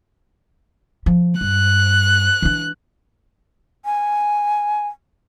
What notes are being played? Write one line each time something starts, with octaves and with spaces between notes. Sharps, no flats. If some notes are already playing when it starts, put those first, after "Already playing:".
F3
G2 F#6
E3 D4
G#5